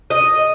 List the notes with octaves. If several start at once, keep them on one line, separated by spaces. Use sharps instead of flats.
D#5